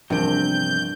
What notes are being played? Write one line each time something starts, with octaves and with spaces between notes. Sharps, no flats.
A#1 E2 G2 C3 A#4 G6 D7